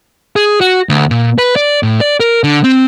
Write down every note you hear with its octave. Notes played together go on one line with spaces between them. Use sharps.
G#4
F#4
D2
A#2
B4
D5
A2
D5
A#4
D3
C4